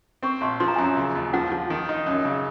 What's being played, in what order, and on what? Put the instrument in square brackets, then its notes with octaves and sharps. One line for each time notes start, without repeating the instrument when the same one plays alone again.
[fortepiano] C4 [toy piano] C#6
[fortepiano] A#1 [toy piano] C6
[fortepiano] F3 [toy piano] C6
[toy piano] A#5
[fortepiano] F#2 [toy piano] G#5
[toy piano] A#5
[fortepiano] C#3
D#2
[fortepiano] F3 [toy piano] F#5
[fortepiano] F3
D#3
D#4
F#2
C#3